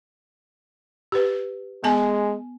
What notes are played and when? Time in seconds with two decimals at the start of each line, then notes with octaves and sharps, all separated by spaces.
1.12 G4 B4
1.84 G#3 B3 G#5 A5